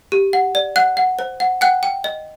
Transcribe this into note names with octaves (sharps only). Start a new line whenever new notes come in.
G4
F#5
D5
F#5 F#6
F#5
C5
F#5
F#5 G5 F#6
G5
D#5